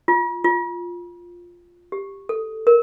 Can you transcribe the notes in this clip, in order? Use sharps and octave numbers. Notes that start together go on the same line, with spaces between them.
F4
F4
G4
A4
A#4